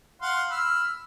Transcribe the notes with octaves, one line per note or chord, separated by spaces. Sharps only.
F5 F#5 C6
B5 E6 F6